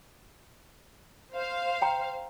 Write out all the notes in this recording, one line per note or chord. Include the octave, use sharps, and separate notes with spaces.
C5 F5
G5 A#5